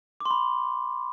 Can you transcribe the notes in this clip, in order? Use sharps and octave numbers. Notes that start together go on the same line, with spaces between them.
D6
C6
B5